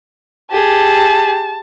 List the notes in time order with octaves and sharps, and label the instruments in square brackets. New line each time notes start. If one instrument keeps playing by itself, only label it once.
[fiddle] G4 G#4 [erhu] A5